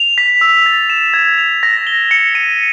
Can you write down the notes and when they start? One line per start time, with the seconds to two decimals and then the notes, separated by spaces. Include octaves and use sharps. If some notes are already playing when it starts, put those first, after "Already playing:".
Already playing: F7
0.18 B6
0.41 E6
0.66 A6
0.90 E7
1.14 G#6
1.38 F7
1.63 A#6
1.87 G7
2.11 C#7
2.35 D#7